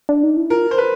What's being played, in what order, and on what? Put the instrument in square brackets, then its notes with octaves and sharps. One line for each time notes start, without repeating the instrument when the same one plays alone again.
[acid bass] D4
D#4
E4
[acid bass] F4 [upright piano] A#4
[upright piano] C5
B4